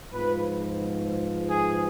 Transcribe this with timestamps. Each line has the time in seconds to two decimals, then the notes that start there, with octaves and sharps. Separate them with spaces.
0.12 G#2 F3 B3 F4 B4
1.50 G#4